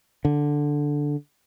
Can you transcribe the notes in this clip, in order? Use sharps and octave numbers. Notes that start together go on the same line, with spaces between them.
D3